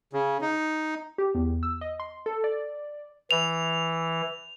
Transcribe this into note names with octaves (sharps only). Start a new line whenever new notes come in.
C#3
D#4
G4
E2
E6
D#5
C6
A4
D5
E3 F7